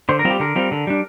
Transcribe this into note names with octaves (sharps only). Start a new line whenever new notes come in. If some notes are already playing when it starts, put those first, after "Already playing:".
D3 C5
A#4
G3 C4 F4
G4
D3 A#4
G3 C4 F4
D3
G3 D4